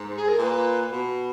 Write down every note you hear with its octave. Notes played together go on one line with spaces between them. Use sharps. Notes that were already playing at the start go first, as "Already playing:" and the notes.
Already playing: G#2
G#4
A#4
A#2 B4
B2